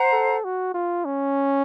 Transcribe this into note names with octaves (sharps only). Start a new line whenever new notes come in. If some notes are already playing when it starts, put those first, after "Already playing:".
Already playing: C5 F#5 A#5
A4
F#4
F4
C#4